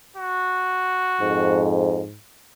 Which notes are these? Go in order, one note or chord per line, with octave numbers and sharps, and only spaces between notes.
F#4
F2 G#2